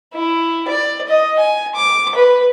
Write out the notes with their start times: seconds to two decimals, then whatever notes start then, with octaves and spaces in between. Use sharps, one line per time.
0.14 E4
0.68 D5
1.09 D#5
1.39 G#5
1.75 D6
2.15 B4